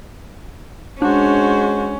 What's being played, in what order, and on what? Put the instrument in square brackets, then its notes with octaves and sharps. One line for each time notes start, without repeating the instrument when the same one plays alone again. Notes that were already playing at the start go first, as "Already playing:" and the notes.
[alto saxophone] G#3 [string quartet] C#4 [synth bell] D4 [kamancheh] F#4 C5